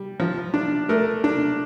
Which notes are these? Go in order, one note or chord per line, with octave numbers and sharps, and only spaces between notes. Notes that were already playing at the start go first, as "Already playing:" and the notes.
Already playing: G3
F3
D4
A3 A#4
D4